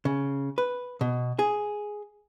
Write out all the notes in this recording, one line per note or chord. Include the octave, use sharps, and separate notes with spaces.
C#3
B4
B2
G#4